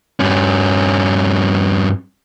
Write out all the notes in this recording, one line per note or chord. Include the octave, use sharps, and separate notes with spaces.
G2 C#4